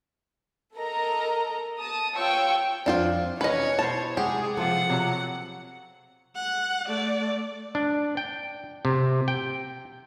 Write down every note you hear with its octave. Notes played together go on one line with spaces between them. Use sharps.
A4 A#4 D#5 A#5
A5 D#6
F4 C#5 G5 C#6 E6
F2 C4 D4 F4 G5
C3 E3 C#4 B4 C#5 D#5 G#5
B2 E4 C5 A5
C3 G#3 G4 G#4 F#5
C3 F3 F4 A4 F#5
C3 F#3 A#5
F#5
A3 D5
D4
G5
C3
G5